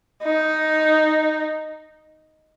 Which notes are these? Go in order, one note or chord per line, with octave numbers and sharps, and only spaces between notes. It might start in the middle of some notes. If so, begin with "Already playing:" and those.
D#4